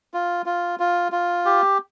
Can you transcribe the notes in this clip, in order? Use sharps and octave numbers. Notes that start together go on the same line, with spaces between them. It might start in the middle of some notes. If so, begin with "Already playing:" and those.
F4
F4
F4
F4
G4